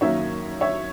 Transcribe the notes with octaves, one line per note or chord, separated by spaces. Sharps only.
F#2 D#3 F#3 A#3 C#5 E5
C#5 E5